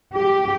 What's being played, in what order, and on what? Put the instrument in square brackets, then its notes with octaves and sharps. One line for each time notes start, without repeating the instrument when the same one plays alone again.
[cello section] G4